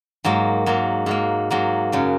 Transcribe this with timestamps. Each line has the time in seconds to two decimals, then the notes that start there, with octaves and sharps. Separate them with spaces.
0.25 G#2 F#3 A#3
0.66 G#2 F#3 A#3
1.06 G#2 F#3 A#3
1.51 G#2 F#3 A#3
1.92 F#2 C#3 F#3